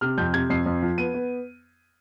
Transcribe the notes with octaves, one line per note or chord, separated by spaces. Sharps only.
C3 F6
F2 G6
C3 G#6
F2 C7
F2
F3
B3 D#7
B3